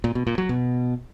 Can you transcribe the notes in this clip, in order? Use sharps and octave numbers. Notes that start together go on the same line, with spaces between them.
A#2
B2
A#2
F#3
B2